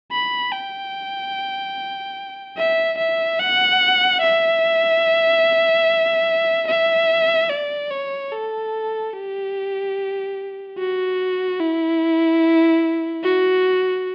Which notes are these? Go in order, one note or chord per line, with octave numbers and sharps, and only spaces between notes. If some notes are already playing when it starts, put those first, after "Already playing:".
B5
G5
E5
E5
F#5
E5
E5
D5
C#5
A4
G4
F#4
E4
F#4